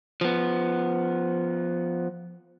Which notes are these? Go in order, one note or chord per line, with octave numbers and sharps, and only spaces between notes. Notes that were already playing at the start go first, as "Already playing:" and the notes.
F3 B3